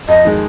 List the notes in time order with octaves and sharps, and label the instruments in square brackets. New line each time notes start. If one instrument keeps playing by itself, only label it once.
[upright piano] F2 [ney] D#5
[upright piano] D#3 G#3